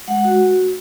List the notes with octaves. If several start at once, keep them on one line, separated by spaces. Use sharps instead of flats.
G#3 F#5
F#4